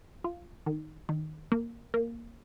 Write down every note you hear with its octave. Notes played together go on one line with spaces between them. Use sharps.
F4
D#3
D#3
A#3
A#3